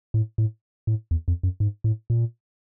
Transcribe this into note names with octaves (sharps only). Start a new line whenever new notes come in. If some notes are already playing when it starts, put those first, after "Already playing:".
A2
A2
A2
E2
F2
F#2
G#2
A2
A#2